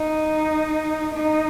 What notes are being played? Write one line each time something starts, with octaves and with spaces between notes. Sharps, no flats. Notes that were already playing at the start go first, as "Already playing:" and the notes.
Already playing: D#4
D#4